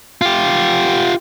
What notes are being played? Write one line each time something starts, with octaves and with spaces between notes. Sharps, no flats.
F4 G4